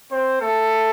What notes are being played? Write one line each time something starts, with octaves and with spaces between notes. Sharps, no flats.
C4 C5
A3 A4